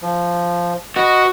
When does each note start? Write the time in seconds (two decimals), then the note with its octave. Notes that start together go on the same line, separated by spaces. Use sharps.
0.02 F3
0.96 F#4 B4 D#5